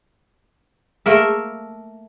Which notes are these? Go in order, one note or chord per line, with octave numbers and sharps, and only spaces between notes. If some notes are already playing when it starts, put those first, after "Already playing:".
A3 A#3 A#4 E5